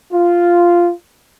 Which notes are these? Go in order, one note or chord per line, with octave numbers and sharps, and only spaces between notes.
F4